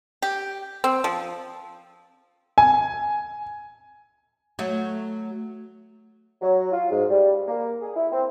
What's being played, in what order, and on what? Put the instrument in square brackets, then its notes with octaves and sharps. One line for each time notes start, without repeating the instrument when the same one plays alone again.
[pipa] G4
C4
F3
[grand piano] G#5
[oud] F#3 A3
[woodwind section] F#3
F4
G#2
G3
A#3
G#4
E4
C4